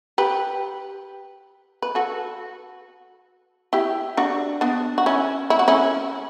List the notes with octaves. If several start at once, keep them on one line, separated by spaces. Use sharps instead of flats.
G4 B4
B4
F#4 A4
E4 G4
D4 F#4
B3 D4
F#4
C#4 E4
E4
F#4
C#4 E4